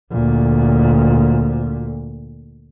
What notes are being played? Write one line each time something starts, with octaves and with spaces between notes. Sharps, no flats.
D2 A#2